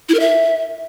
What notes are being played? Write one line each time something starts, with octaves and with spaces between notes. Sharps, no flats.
E4
A#4
E5